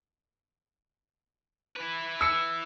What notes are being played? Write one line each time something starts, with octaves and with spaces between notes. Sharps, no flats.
E4 B4
E6 C#7